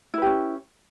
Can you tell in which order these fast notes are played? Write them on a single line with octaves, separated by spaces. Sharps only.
E4 B4 G4 C#4